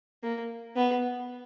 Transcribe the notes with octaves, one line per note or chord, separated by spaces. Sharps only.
A#3
B3